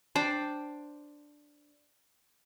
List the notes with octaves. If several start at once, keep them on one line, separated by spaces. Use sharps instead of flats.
D4 C5 D5 G5